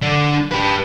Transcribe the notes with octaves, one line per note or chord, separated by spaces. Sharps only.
D3 D4
G4 B4